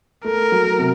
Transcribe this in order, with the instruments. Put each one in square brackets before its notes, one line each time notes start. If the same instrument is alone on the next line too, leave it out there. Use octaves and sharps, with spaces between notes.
[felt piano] A3 [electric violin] A#4
[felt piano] F#3
C3